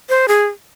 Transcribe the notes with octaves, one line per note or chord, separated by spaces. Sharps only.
C5
G#4